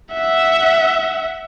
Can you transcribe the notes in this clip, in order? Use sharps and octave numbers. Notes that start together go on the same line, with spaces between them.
E5 F#5